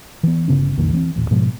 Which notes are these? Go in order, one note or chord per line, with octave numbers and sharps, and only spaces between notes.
E3 B3
G1 C#3 B3 C#4
B1 F2 D#3 A#3
E3 B3 C4
D#1 A1
G#2 B2 F3 G#3